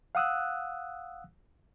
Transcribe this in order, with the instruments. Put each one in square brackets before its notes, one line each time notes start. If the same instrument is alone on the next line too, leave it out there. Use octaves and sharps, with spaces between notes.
[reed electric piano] F5 F#5 D#6 E6 F#6